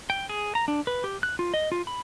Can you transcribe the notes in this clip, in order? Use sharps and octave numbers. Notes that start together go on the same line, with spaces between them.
G5
G#4
A#5
D4
B4
G4
F#6
F4
D#5
F4
B5